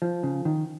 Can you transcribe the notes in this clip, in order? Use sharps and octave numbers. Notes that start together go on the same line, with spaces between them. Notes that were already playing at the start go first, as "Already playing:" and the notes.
F3
C#3
D#3